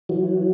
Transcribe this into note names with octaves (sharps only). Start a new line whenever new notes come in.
E3 F#3